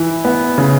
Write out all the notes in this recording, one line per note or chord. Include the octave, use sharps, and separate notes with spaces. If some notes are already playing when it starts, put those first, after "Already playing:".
Already playing: E3 E4
B3
C#3